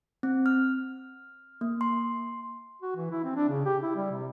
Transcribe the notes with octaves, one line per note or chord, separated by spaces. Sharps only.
C4
F6
A#3
C6
F#4
E3
E4
C4
D4
C#3
G4
E4
G3
C3